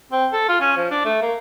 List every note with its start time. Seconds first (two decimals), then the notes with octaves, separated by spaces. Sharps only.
0.12 C4
0.33 A4
0.49 F4
0.61 C#4
0.76 F3
0.91 D4
1.05 A3
1.22 A#3